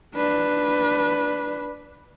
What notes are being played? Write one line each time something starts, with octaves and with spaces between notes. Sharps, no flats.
D4 B4